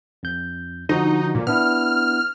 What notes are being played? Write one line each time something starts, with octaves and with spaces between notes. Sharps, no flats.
F2 G6
D3 F3 D#4 F#4
A#2
B3 D4 E4 F6